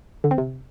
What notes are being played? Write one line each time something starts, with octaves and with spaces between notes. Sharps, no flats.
D3
C4
C3